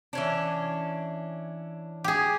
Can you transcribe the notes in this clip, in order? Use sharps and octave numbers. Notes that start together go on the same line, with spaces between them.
E3 C#4 D4
G4 G#4